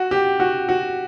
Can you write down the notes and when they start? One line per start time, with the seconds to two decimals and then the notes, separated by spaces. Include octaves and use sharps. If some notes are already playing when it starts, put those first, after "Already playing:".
Already playing: F#4
0.11 G4
0.40 F#4
0.69 F#4